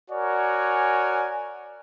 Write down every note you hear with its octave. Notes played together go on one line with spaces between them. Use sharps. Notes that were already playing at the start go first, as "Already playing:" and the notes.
F#4 A#4 C#5 D5 G#5